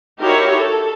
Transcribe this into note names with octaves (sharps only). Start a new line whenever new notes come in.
D#4 E4 F#4 G4 A#4 C#5
A4